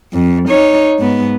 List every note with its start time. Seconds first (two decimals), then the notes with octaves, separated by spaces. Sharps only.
0.13 F2
0.49 D#4 C#5
0.99 G#2 B3